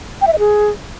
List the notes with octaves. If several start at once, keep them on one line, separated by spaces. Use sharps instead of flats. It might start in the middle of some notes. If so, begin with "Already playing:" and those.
G5
E5
D#5
G#4